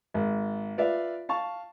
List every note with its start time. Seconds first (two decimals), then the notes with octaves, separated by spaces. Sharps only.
0.14 G#1
0.77 F4 B4 D5 E5 F5
1.29 F5 A5 C#6